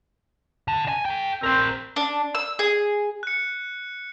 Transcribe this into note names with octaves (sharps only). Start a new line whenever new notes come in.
D3
G#5
A4 G5
C4 A#4 C5
D4
E6
G#4
F#6 C#7